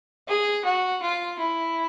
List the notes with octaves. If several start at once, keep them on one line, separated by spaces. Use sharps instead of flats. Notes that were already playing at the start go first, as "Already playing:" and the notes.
G#4
F#4
F4
E4